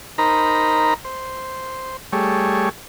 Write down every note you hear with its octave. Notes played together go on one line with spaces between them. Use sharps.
D#4 A#4 C5 A#5 B5
C5
G3 A3 G#4 C#5